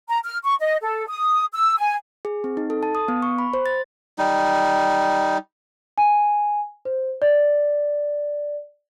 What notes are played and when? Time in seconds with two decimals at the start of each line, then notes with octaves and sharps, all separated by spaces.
0.09 A#5
0.24 F6
0.44 C#6
0.60 D#5
0.81 A4
1.08 D#6
1.53 E6
1.78 G#5
2.25 G#4
2.44 C4
2.57 D#4
2.70 A4
2.83 A5
2.95 D#6
3.08 B3
3.22 C#6
3.38 B5
3.54 C5
3.66 A6
4.18 G3 D#4
5.98 G#5
6.85 C5
7.22 D5